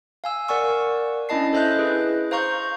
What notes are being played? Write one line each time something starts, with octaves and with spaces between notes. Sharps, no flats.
F5 G#5 E6
A#4 D5 F#5 G#5 C#6 E6
C#4 D4 E4 D#5 A5 C7
A4 C5 D#5 E5 F#6 G6
E4 G#4 B4
C5 F5 A#5 C#6 G6